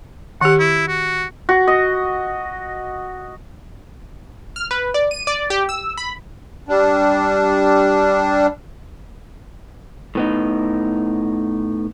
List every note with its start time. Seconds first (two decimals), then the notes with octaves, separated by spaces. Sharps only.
0.41 D#3 G4 F#5
0.60 E4
0.88 F#4
1.49 F#4
1.68 D#5
4.56 F6
4.71 B4
4.94 D5
5.11 D#7
5.27 D5
5.50 G4
5.69 E6
5.97 B5
6.69 G3 D4
10.15 A2 B3 D#4